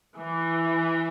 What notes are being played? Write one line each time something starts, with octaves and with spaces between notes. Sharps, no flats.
E3